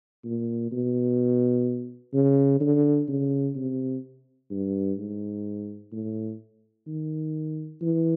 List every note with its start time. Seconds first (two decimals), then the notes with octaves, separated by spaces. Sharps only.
0.25 A#2
0.72 B2
2.14 C#3
2.61 D3
3.08 C#3
3.56 C3
4.51 G2
4.98 G#2
5.92 A2
6.87 D#3
7.81 E3